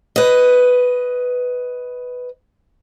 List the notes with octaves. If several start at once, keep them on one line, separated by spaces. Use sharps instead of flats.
B4 D#5